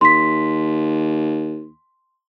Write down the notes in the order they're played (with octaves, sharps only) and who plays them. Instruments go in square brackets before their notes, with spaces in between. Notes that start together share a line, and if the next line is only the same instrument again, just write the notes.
[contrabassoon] D#2 [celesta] C6 B6